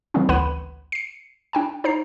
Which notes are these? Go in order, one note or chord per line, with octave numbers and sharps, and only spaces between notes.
C#3 E3 G3 A#3 C4 C#4
A1 D2 B4 F#5 B5 D#7
C7 C#7
D4 G5 G#5
D#4 C5 A#5 C7